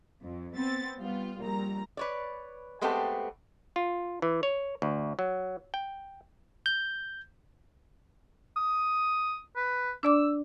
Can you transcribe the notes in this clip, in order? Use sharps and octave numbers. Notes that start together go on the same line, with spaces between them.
F2
B3 C4 A6
G3 B3 F4
A#1 G3 A#5
B4 C#5 D5
G#3 A3 B3 C4 G4 A4
F4
E3
C#5
D2
F#3
G5
G6
D#6
B4
D4 D5 D6 E6